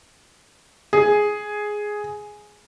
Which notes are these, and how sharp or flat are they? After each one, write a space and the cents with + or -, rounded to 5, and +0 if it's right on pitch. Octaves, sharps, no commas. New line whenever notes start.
G#4 +5